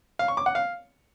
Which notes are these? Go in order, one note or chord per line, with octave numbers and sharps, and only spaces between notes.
F5
C#6
D6
F#5
F5